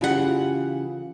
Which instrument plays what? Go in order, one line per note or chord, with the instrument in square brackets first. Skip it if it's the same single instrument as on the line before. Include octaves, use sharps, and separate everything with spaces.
[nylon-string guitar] C#3 E3 F4 G4 A#4 F#5